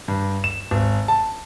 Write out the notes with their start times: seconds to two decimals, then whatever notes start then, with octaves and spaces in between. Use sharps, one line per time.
0.08 G2
0.44 E7
0.71 G#1
1.08 A5